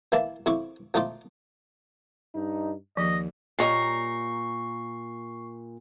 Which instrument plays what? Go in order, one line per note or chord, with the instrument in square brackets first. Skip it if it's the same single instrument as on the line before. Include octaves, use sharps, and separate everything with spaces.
[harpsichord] E3 A#3 E4 A5
F2 E4 C#6 D6
F3 A3 D#4 F4 D6
[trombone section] G2 D#4
[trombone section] D#2 [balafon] F3 [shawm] D#5
[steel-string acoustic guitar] A#2 A#5 [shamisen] G3 C#5 D#5 [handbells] C#6 C7